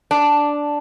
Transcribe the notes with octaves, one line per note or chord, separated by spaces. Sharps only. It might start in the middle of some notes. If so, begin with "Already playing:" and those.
D4